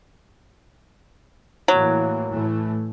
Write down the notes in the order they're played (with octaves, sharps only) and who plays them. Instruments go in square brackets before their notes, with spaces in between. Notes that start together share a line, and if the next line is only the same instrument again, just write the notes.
[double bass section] A2 E3 A#3 [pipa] F#3
[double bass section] A2 E3 A3